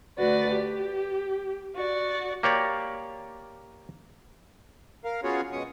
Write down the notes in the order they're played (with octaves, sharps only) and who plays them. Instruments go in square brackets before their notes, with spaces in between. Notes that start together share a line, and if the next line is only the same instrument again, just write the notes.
[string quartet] D2 F#4 B4 D5
G4
F#4 D5
[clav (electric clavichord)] A#3 G4 C#5 D5
[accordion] A#4 F5
B3 C#4 F4 F#4 G#4 C#5
B2 G#3 C#4 C#6 D#6